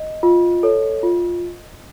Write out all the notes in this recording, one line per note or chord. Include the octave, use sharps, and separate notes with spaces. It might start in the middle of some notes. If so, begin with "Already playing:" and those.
Already playing: D#5
F4
A4 C#5
F4